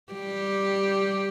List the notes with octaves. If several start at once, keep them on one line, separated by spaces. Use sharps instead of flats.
G3 G4